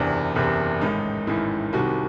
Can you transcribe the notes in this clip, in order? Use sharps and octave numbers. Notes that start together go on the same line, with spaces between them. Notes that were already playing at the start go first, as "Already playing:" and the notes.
Already playing: F#1 E2 C3 D4
F#1 E2 C3
A1 G#2 D#3 D#4
A1 G#2 D#3 E4
C2 C3 D#3 F#4